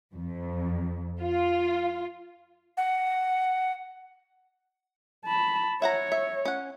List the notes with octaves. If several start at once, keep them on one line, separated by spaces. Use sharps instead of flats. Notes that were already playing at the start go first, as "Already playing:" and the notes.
F2
F4
F#5
A5 B5
C#5 E5 F#5 A#5
E5
C#4 F#5